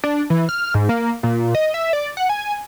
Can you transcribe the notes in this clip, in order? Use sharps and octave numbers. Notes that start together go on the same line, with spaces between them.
D4
E3
F6
G#2
A#3
A#2
D#5
E5
D5
F#5
G#5